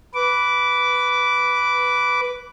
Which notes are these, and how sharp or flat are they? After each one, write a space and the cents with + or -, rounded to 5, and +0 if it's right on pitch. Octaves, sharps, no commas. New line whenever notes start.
B4 +0 D6 -15